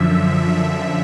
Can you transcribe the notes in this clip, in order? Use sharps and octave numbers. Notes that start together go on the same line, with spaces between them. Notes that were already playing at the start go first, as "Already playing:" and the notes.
Already playing: F#2 D3 F3 E5